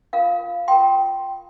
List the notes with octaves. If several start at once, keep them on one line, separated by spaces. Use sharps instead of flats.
F4 A#4 F5
F4 A#4 G5 C6